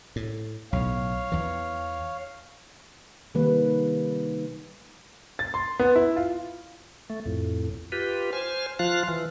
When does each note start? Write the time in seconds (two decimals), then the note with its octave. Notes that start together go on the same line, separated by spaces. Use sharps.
0.16 A2
0.73 B1 A2 C#5 F5
1.32 E2 E3
3.35 C3 D#3 G3 A#3 B4
5.39 A6
5.54 C6
5.79 B3
5.96 E4
6.16 F4
7.10 A3
7.26 F2 A2
7.92 F4 G4 B4
8.33 C5 G#5 F6
8.79 F3 F4 F5 F#6
9.08 E3